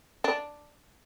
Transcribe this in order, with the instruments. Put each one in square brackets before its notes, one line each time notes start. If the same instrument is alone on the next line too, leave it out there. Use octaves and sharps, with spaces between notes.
[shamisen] D4